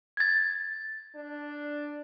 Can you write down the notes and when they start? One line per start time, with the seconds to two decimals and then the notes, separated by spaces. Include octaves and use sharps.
0.17 G#6 A6
1.16 D4